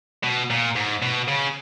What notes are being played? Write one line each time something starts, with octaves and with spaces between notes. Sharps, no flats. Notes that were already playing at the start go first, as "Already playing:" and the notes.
B2
A#2
G#2
B2
C#3